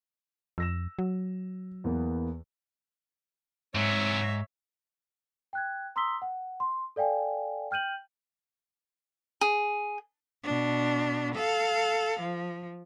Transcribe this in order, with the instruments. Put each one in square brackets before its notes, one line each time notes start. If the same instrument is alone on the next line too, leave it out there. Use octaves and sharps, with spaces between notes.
[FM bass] F2 [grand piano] E6 A#6 E7
[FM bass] F#3
[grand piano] E2 A#3 B3
[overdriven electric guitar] G#2 [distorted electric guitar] C3 F#3 [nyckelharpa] C#5 E5
[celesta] G5 F#6 G#6
A#5 C6 D#6 E6 B6 G7
F#5
C6
A4 D5 F5 G5 G#5
G5 F6 G6 D#7 F#7
[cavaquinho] G#4
[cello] B2 D4
A4 F5
F3